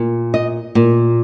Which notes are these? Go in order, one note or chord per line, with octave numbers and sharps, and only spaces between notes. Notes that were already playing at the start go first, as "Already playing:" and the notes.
Already playing: A#2
D#5
A#2